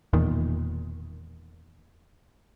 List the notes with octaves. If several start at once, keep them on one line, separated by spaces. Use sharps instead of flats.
E1 E2 A#2 D#3